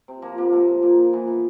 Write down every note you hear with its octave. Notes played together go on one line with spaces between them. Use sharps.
C3
F3 A#3
C3 A#3
F3 A3
A#2
A#2 A#3
A#2
E3 B3
E3